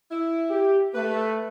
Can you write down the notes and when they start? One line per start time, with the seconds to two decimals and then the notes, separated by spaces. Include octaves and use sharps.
0.11 E4
0.50 G4
0.94 A3 B4